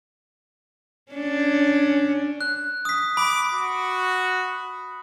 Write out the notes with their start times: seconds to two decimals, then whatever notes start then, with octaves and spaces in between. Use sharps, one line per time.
1.12 C#4 D4
2.41 F#6
2.85 D#6 B6
3.17 B5 D6
3.53 F#4